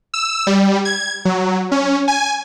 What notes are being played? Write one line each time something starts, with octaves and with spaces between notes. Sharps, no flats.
E6
G3
G#6
F#3
C#4
G#5